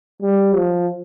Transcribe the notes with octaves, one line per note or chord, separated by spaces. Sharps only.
G3
F3